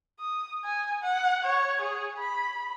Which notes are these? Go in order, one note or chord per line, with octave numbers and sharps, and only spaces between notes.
D#6
G#5
F#5
C#5
G#4
B5